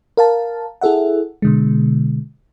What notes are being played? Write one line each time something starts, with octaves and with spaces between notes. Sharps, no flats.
A#4 F5 A5
E4 G#4 A4 E5 F#5
B2 D3 G#3